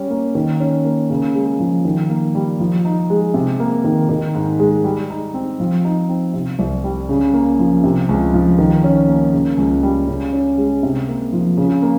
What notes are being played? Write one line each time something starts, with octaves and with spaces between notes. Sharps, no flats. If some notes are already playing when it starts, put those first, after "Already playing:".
Already playing: G3 C#4
A#3
D#3
C#4
A#3
C#3
G#3
F3
D#3
A#3
G3
F3
D#4
G#3
C3
A#3
D#3
D#3
G#2
G#3
G3
D#4
C4
F3
D#4
C4
C3
C2
G3
C#3
A#3
F3
C3
C#2
F3
D#3
C#4
A#3
C#3
C#2
G3
C#3
C#4
G#3
C3
A#3
F3
C#3
A#3